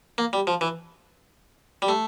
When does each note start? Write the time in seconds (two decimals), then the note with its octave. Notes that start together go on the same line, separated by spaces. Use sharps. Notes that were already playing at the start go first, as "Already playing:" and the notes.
0.18 A#3
0.33 G3
0.47 F3
0.61 E3
1.82 G3
1.88 A3